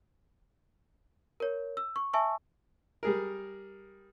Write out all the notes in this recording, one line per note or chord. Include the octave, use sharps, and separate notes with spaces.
A#4 C#5
E6
C#6
E5 G#5 A5 C#6 E6
G3 G#4 A#4